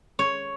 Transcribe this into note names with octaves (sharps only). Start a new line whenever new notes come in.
C#5